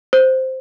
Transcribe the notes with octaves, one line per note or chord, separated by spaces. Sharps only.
C5